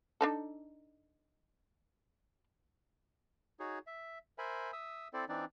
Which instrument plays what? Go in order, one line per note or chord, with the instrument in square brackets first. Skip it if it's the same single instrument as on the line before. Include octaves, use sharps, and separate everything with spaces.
[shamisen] D4 D#4 A4
[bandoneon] D#4 F#4 G#4 C#5
E5
A#4 C5 E5 G#5 B5
E5 D#6 E6
C4 E4 A4 C5 D5
E3 C4 D4 D#4 D5